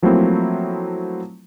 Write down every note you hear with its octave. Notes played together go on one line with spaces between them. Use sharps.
F3 F#3 A3 A#3 C4 E4